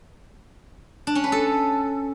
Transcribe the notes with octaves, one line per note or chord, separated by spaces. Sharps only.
D4
C#4
B4
A4